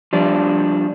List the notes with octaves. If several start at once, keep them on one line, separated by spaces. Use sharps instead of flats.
F3 G3 D4